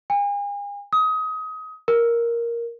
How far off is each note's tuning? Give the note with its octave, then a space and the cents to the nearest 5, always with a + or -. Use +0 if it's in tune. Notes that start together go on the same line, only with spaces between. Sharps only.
G#5 -40
D#6 +25
A#4 +5